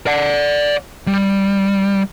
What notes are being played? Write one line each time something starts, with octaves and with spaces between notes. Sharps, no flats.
D5 F#5
G3